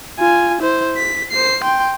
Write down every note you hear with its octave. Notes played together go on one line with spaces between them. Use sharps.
F4 G#5
E4 C5
B6
C5 C7
G5 C6